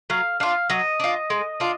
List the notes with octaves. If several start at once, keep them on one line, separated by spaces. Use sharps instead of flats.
F#3 F5
D4 F4 F5
F#3 D#5
D4 F4
G#3
D4 F4